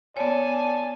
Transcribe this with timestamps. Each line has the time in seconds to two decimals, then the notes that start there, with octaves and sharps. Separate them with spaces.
0.17 B3 C#5 D5 G#5 A5